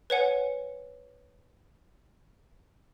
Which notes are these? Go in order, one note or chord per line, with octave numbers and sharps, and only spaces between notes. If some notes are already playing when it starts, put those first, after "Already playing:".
B4 C#5 F#5 G#5